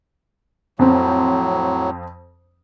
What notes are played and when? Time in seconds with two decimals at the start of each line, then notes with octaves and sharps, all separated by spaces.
0.79 F2 A2 F#3 C4